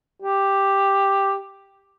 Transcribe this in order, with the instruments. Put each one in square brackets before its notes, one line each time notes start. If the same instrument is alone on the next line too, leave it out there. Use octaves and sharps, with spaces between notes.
[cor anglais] G4